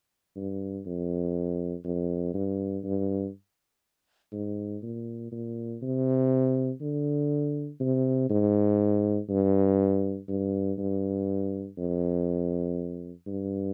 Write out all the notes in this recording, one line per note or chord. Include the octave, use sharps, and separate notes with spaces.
G2
F2
F2
G2
G2
G#2
A#2
A#2
C3
D3
C3
G#2
G2
G2
G2
F2
G2